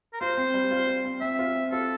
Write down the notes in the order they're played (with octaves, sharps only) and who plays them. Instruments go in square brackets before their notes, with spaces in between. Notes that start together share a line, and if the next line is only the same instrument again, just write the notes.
[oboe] A#4
[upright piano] F4 [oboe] C5
[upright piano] C4
G3
F4
F4
C4
[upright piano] C4 [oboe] E5
[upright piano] F4
C4
[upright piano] F4 [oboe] A4